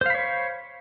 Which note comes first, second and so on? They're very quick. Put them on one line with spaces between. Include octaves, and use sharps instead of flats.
C5 F5 B5 C#5